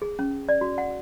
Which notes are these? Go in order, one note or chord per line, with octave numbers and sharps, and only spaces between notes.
G#4
C#4
D5
F#4
F#5